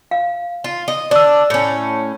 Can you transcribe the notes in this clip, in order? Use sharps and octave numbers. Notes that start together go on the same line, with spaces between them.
F5
F4
D#5
D4 D5 E6
A2 C#4